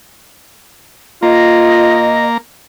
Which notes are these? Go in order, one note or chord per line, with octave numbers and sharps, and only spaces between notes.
A#3 F4 D#5